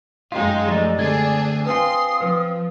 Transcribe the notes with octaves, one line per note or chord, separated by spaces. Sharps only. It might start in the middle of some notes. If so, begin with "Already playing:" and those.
F#2 G#3 D#4 F4 F5 G5
F3 A3 G4 D5 D#5 A#5
D3 A3 C4 D4 G#4 G#6
C4 F4 B4 G5 G#5 C6 D#6
F3 B4